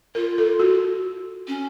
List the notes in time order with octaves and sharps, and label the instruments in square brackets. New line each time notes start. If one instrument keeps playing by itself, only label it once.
[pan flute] F4 [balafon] A#4
[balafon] A4
F#4
[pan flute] C#4